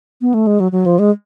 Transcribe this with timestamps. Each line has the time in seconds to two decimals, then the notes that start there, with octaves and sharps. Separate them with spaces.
0.21 B3
0.34 A3
0.47 G#3
0.60 F#3
0.72 F#3
0.86 F3
0.99 G#3